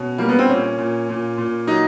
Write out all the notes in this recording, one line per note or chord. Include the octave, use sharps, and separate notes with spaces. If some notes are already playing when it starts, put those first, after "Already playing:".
Already playing: B2 C#4
G3 A#3
B3
C4
A#2 C#4
A#2
A#2
A#2
F#3 D#4